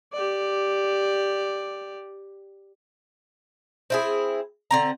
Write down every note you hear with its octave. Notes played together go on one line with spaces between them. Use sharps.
G4 D5
C4 E4 G#4
D3 C4 A#5